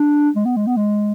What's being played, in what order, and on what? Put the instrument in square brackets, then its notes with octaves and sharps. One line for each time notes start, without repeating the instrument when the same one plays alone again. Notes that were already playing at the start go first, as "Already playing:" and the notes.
Already playing: [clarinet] D4
G#3
B3
G#3
B3
G#3